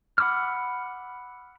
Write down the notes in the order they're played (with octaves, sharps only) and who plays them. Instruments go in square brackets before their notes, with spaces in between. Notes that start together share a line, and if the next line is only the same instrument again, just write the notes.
[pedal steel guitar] F#5 B5 D6 E6 F6